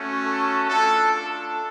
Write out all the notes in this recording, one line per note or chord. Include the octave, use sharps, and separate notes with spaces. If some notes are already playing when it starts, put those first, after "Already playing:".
Already playing: A3 C#4 F#4
A4
A3 D4 F4 A4
A4